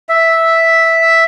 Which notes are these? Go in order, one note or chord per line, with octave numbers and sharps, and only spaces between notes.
E5